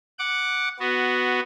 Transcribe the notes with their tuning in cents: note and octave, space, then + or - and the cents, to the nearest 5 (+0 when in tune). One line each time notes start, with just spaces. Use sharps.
F#5 -5 D6 +0
B3 +5 F#4 +0